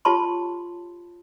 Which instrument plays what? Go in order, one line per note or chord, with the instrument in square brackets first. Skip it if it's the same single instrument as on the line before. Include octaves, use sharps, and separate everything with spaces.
[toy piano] F4 G4 C#5 A5 B5 C6